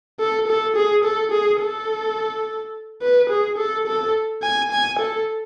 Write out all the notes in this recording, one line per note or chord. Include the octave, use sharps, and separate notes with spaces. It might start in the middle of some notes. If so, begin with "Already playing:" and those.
A4
A4
G#4
A4
G#4
A4
B4
G#4
A4
A4
G#5
G#5
A4